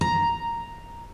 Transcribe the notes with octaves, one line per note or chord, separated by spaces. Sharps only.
A#5